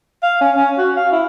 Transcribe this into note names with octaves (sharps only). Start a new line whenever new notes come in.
F5
C#4
C#4
F#4
F5
E4